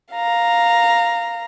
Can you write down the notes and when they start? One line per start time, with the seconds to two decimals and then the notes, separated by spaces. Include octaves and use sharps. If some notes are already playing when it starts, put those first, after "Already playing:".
0.12 F5 A#5